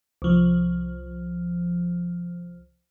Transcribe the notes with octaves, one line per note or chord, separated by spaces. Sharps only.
C2 F3